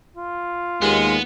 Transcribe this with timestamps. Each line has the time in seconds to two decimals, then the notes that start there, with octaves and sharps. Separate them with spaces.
0.16 F4
0.82 D#2 G#3 B3